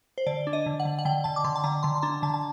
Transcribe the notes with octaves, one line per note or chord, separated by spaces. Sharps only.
C5
D3 D5
D4
D#5
D3
F#5
D3
F#5
D3 G5
D3 A5
D6
D3 C6
A5
D3 A#5
D3 C6
C6
D4 A#5
D3 A5
A5